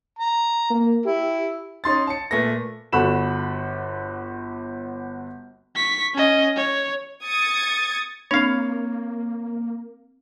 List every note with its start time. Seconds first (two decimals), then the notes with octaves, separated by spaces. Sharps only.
0.19 A#5
0.70 A#3
1.06 E4 G4
1.84 C#4 D#4 C6 A6
2.07 A5 C#7
2.31 A#2 A3 B4 A#6
2.92 G1 F#4 A4 B5 E7
5.75 C#6 B6
6.14 C#4 D#5
6.56 C#5
7.25 D#6 G#6 A6 C#7
8.31 A#3 C4 D4 C#5 F5